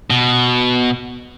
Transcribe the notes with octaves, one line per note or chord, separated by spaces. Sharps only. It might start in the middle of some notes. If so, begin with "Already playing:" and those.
B2